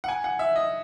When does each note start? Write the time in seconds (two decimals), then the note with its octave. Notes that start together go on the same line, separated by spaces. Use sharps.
0.04 F#5
0.08 G#5
0.24 F#5
0.39 E5
0.56 D#5